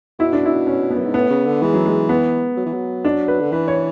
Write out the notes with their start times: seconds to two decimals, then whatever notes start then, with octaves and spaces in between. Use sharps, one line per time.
0.19 B2 E4
0.33 D4
0.45 E4
0.67 C#4
0.91 B3
0.98 F#2
1.05 G#2
1.14 A2 B3
1.30 C#3
1.46 D3
1.62 E3 G#3
1.74 F#3
1.86 G#3
2.09 B3
2.57 F#3
2.66 E3
2.73 F#3
3.05 D4
3.28 B4
3.41 D3
3.52 E3 B4
3.68 C#5